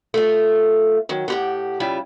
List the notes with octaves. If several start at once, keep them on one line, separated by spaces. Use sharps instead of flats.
A3 F4
D#3 F#3
A2 G4 F#5
C#3 G3 E4 F4